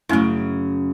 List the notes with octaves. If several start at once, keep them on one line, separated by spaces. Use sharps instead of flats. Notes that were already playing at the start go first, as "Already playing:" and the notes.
F#2 C#3 A3 C#4 E4